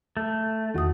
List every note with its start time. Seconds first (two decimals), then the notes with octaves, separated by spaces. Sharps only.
0.17 A3
0.75 E2 D#3 F#4 D#6